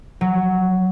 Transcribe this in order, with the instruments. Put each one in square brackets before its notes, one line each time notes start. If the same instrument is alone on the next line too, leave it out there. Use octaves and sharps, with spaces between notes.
[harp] F#3